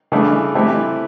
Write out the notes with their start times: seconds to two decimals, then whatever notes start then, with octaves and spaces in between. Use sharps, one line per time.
0.12 C#3 E3 A3 D4
0.55 E3 A3 C4 E4 G4